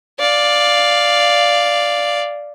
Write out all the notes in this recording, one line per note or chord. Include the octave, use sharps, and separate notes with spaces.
D5 F5